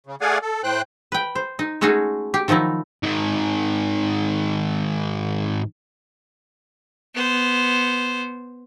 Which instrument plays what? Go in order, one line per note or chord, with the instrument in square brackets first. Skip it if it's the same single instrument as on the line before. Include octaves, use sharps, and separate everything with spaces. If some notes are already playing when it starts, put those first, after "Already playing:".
[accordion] C#3
A3 G#4 D5 F5 F#5 G#5
A4
A2 C5 G5 F#6
[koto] B4 G5
C5
D#4
G#3 A3 C#4 D#4 F#4 G#4
G4
D#3 F3 F#3 D#4 E4
[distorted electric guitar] G#2 D#3
[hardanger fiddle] B3 C5